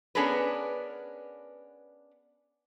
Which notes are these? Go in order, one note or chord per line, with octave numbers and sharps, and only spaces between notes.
B3 C#4 D4 G#4 A#4 B4